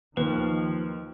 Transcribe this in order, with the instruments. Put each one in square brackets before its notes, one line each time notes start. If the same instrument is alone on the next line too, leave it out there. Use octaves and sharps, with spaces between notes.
[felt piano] D#2 [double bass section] D#3 [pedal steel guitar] F3 [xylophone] B4